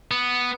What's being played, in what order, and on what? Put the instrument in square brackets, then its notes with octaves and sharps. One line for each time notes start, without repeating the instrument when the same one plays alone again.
[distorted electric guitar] B3